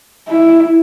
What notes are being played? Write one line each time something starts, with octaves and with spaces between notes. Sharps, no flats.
E4